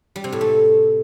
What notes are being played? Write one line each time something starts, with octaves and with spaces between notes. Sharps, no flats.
G3
C3
A2
A3